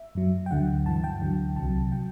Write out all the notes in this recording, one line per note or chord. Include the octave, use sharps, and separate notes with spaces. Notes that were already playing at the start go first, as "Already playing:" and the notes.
Already playing: E5
F#2 F#3
G5
D2 D3 F#3 F#5
G2 E3 A5
G5
D2 D3 F#3
C2 C3 F#3 A5
F#3 G5